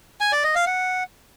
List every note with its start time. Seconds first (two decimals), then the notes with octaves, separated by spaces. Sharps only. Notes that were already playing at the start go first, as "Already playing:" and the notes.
0.21 G#5
0.32 D5
0.44 D#5
0.55 F5
0.67 F#5